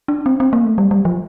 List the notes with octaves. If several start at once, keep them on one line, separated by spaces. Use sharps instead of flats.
D4
C4
C4
A#3
A3
G3
G3
F3